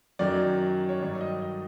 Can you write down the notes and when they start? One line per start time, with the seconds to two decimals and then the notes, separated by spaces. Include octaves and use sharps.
0.19 F#2 D#3 F#3 D5
0.89 C#5
1.01 G2 D#3 F#3 D5
1.21 D#5
1.42 D#5